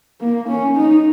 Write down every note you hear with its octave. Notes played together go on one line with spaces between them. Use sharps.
A#3
C#4
D#4